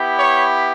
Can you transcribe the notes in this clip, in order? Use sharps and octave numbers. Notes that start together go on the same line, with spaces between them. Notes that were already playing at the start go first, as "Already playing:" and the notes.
Already playing: B3 E4 G4
C#5